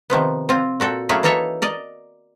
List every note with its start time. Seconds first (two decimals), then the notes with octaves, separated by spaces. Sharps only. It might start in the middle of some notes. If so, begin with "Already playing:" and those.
0.10 C3 D#3 F3 B3
0.49 C4 F4
0.80 A#2 F#4 A4 G5
1.09 F#3 A3 A#3 C#4 E4 G#4
1.23 E3 A#3 D#4 A4 C#5 E5
1.62 A#4 D5 D#5